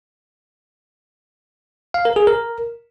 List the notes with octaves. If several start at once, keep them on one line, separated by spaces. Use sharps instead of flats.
F5
A#4
G#4
A#4